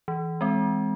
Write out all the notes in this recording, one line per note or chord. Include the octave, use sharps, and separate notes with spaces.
E3
G#3 C4